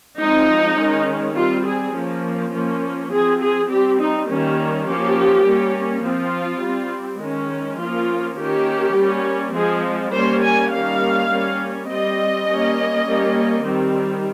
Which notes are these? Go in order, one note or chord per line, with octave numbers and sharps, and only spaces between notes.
F3 G#3 C4 D#4
D#3 G#3 C#4
G3 C4 F4
G#4
F3 A#3 C#4
F3 A#3 C#4
F3 C4 G#4
G#4
G3 C4 G4
D#4
D#3 G3 A#3 C#4
F3 A#3 C#4 G4
G3 A#3 C#4
F3 C4 F4
G3 C4
D#3 G#3 C#4
F3 A#3 C#4 F4
D#3 A#3 C#4 G4
G3 A#3 C#4
F3 G#3 C4 G#4
G3 A#3 C#4 C5
G#5
D#3 G3 A#3 C#4 F5
G3 A#3 C#4
G3 C4 D#5
G3 A#3 C#4
G3 A#3 C#4
D#3 G3 C4